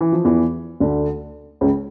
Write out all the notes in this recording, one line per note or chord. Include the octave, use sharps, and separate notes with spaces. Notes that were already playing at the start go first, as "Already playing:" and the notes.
E3
F3
E2 E3
D2 D3
C#2 C#3